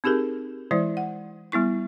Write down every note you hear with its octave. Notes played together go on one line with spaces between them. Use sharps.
C4 D#4 G4 G#4 A#4
E3 G#3 E4 C5 D5
F#5
G3 B3 E4 C#6